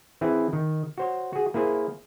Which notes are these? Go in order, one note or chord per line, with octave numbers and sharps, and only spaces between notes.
E3 C4 E4 G#4
D#3
F#4 C5 C#5
F#4 G#4
A#3 E4 G#4 C5